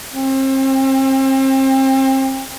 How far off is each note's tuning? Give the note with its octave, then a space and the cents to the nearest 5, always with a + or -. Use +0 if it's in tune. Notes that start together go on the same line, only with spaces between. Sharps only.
C4 +35